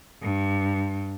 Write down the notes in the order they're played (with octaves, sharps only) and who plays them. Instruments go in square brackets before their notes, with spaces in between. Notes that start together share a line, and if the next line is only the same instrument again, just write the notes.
[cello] G2